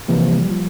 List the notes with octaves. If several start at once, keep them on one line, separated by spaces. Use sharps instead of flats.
C3 E3 F3 A#3
F3
G3
G3
F3